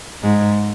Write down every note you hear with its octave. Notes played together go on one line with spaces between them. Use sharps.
G#2 G#3